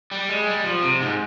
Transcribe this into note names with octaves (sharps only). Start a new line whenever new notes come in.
G3
G#3
G3
F3
C3
G#2